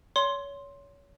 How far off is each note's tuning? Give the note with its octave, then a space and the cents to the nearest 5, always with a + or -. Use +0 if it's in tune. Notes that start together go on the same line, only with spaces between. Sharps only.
C#5 +25 C6 +5